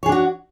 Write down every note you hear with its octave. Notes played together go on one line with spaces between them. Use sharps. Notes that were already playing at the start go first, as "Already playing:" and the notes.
D4 F#4 G#4 C#5